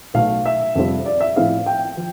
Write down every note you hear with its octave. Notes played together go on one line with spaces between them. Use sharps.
B1 B2 A3 F5
E5
F2 C3 G3 C4 F4
D5
E5
A2 F3 C4 E4 F5
G5
F3